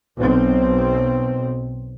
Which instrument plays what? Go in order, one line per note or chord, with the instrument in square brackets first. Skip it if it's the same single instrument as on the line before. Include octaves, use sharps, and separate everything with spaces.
[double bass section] B1 C4